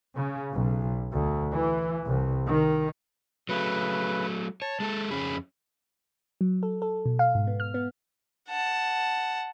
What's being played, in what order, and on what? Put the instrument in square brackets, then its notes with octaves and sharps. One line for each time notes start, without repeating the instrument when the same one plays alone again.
[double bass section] C#3
B1
D2
E3
C2
D#3
[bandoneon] C#3 B4 [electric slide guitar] F#3 A3
[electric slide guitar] C#5 [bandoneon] A5
[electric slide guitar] G#3 A4
[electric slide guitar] F2 C#4 G#4 [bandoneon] B5
[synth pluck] F#3
A4
A4
B2
F5
G#2
B3
F6
B3
[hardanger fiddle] F#5 A5